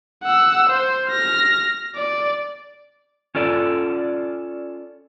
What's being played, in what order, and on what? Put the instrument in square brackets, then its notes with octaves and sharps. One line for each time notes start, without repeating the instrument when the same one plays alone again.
[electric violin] F#5 E6
C5
F6 A#6
D5
[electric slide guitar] C#4 F4 A4 D5